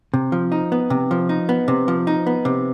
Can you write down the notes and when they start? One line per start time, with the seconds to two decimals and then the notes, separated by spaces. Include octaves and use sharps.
0.14 C3
0.32 F3
0.52 D#4
0.72 B3
0.90 C3
1.11 F3
1.29 D#4
1.49 B3
1.68 C3
1.88 F3
2.07 D#4
2.26 B3
2.45 C3